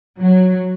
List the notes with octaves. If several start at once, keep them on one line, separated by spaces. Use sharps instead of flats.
F#3